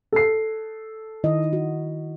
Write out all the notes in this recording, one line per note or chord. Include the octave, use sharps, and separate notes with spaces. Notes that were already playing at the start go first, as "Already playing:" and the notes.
A4 C7
D#3 E4 D#5
F#4